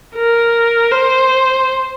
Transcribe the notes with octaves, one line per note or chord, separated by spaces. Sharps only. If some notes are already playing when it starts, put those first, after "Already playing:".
A#4
C5